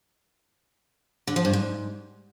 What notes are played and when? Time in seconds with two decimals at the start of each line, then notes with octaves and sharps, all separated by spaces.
1.27 D3
1.36 F3
1.45 G2
1.53 G#2